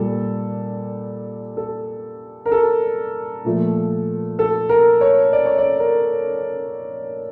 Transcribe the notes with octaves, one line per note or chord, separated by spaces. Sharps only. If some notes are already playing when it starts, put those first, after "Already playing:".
Already playing: A#2 G3 A4
A4
A#4
A4
A#2 F3 A3
A4
A#4
C#5
D5
C#5
D5
A#4